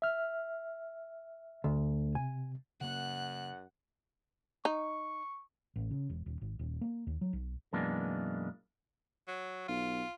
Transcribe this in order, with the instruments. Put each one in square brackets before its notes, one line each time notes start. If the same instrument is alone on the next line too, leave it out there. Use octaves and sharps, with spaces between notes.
[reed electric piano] E5 F6
[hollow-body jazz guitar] D2
[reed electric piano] C3 [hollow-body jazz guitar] G#5
[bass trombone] F#2 [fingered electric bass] C#3 A#3 [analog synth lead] F#5 [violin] F#6
[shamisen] D#4 [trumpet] C#6
[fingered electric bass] A1
C#3
E1
D#1
G#1
D#1
A#3
D#2
F#3
B1
[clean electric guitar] F#2 B2 E3 G#3 A#3 D4
[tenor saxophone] F#3
[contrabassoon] B1 [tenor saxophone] F4